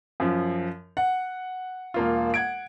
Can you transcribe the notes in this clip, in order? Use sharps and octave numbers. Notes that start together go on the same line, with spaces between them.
F#2 F3
F#5
E1 A#3 F4
F#5 G#6 D7